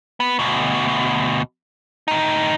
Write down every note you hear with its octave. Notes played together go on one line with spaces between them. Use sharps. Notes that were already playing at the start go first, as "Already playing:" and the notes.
B3
D2 B2
A2 D#4